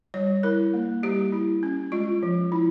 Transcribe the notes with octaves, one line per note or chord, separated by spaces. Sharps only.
G3 C#5
E4 A#4
A#3
G3 G4
E4
C#4
G#3 F4
F3
E4